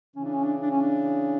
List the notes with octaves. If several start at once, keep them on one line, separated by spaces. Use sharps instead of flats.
C#3 E3 C#4
D4
C#4
D4
D4
C#4
D4